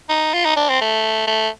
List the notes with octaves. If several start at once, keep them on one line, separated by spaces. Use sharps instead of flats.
D#4
F4
D#4
D4
C4
A3
A3